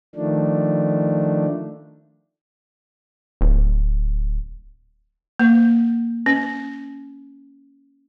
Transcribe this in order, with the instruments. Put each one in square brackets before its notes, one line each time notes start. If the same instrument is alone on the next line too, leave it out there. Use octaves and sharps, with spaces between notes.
[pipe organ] D#3 F3 A3 D4
[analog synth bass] D1
[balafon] A#3
C#4